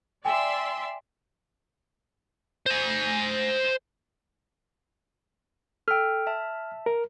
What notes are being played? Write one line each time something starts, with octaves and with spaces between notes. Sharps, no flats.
D5 E5 G5 G#5 C6
C5 G#5
A4 G5 F6
E5 A5
A#4